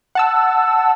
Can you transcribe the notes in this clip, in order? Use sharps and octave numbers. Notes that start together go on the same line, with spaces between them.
F#5 A5 E6